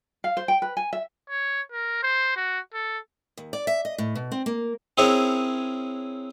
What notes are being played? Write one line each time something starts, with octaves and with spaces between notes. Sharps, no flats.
F5
C5
G5
B4
G#5
E5
C#5
A#4
C5
F#4
A4
D#2
D5
E5
D#5
A2
B2
C4
A#3
C4 C#4 E4 G#4 A#4 C#5